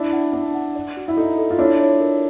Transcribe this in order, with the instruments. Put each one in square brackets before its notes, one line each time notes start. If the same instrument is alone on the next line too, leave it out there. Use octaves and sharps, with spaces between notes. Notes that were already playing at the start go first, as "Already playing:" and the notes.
Already playing: [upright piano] D4 E4 [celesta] D5
[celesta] F#5
[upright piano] D4 [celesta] F#5
[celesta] F#5
D5
F#4
[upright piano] E4
[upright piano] D#4 [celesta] A4
[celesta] A4
[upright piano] F4
[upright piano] D4 E4 [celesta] C#5
[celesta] C#5
A#4